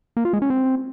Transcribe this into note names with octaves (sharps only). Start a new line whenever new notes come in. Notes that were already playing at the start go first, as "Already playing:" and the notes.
A#3
F4
G#3
C#4
C4